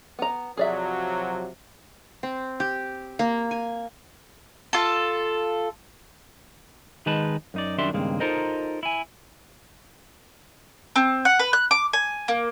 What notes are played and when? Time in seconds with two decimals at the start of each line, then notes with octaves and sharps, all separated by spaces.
0.19 B3 A#5
0.57 C3 F3 F#3 G#4 D5 E5
2.23 C4
2.60 G4
3.19 A#3
3.51 G#5
4.73 F4 A4
7.06 D#3 G#3 D#4 B4 A5
7.54 F#2 D#4 D5
7.78 F#2 D#3 G3 D4 E5 C6
7.93 C#2 G2 D#3 G#3 A#3 C4
8.20 D#4 F4 A4 A#4 C5 D#5
8.83 E4 G#5
10.96 C4
11.25 F#5
11.39 B4
11.53 F#6
11.71 D6
11.93 G#5
12.28 A#3